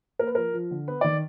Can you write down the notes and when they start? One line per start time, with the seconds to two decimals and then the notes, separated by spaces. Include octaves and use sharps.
0.19 A#3 A#4
0.27 B4
0.35 F3 A#4
0.53 F3
0.71 D3
0.88 B3 B4
1.01 D#3 D5